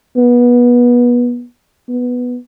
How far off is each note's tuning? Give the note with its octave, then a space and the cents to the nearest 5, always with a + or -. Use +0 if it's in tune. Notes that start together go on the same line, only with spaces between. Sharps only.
B3 -25
B3 +0